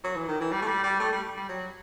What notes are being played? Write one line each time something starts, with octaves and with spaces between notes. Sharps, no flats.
F#3
E3
D#3
E3
G3
A3
G3
G3
A3
G3
G3
F#3